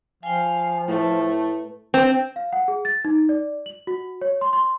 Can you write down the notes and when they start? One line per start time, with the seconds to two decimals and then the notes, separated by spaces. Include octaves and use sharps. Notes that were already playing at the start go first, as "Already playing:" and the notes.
0.23 F3 F5 G5 G#5
0.88 A2 A3 B4 A5
1.94 C4
2.36 F5
2.53 F#5
2.68 G#4
2.85 A6
3.05 D#4
3.29 D5
3.66 F#7
3.87 F#4
4.21 C#5
4.41 C6
4.53 C6